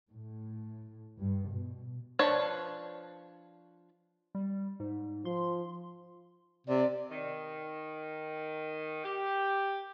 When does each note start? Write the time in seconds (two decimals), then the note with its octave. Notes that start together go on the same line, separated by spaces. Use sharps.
0.11 A2
1.21 G2
1.51 B2
2.19 F3 D4 B4 C#5
4.35 G3
4.80 G#2
5.25 F3 C6
6.67 C3 D5
7.11 D#3
9.04 G4